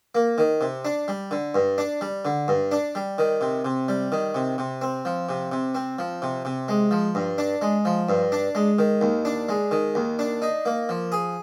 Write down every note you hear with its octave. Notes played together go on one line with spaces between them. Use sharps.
A#3
D#3
C3
D4
G3
D3
G2
D4
G3
D3
G2
D4
G3
D#3
C3
C3
G3
D#3
C3
C3
C4
F3
C3
C3
C4
F3
C3
C3
G#3
F3
G2
D4
G#3
F3
G2
D4
G#3
D#3
D#2
D4
G#3
D#3
D#2
D4
D#4
A#3
F3
G#4